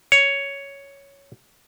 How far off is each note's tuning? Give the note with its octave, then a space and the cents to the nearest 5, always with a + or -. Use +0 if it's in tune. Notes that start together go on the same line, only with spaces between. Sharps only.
C#5 +5